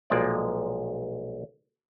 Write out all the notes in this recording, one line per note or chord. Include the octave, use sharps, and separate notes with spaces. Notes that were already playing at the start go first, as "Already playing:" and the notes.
B1 A#2 F3 G#3 A#3 D5